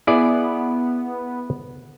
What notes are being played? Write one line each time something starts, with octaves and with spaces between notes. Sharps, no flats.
B3 E4 G#4 D5